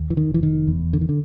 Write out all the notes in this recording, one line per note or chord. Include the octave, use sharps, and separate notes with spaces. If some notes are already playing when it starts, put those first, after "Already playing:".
Already playing: D#2
E3
D#3
F1 E3
D#3
E2
D3
D#3
D3